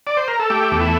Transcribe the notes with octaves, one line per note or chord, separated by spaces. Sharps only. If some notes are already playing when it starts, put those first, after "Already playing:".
D5
C5
A#4
A4
A3 G4
E2
E4